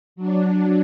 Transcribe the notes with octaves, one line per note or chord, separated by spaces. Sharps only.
F#3 D4